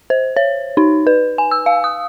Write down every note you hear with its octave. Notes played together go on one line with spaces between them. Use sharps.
C5
C#5
D#4
B4
G#5
E6
F5
D#6